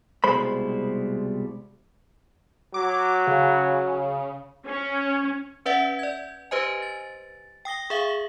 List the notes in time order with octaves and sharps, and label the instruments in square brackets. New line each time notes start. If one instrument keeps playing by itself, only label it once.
[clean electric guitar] C2 B2 G3 G#3 C5 B5
[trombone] F#3 [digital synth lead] D6
[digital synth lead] C#3
[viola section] C#4
[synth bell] C#4 B4 D5 E5 F#5
D5 G#6
G4 B4 C5 D#5 G#5
A6
G5 D#6 A#6 G7
G#4 E5 F5 F#7